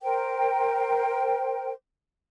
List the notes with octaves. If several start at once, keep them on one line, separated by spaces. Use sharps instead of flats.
A#4 C5 G5